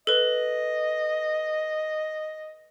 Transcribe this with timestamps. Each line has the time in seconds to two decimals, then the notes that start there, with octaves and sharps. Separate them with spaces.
0.07 A4 B4 D#5